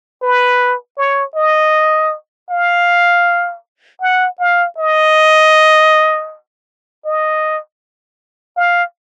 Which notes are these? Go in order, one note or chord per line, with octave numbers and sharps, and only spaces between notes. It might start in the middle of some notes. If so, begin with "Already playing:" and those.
B4
C#5
D#5
F5
F#5
F5
D#5
D#5
F5